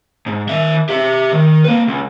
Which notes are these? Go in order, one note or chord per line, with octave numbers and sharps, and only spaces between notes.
G#2
D#3 E5
G4 E5
D#3
A#3 B4
C#2